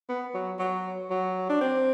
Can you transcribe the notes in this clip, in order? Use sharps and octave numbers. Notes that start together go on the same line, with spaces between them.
B3
F#3
F#3
F#3
D4
C4